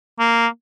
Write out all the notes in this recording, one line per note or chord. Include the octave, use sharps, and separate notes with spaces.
A#3